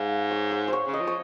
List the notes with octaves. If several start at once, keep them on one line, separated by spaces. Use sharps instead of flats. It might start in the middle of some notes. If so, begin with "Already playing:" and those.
Already playing: G#2 D#5 F5
C#5
C5
C5
C#5
C#3
D#5
F3
C#5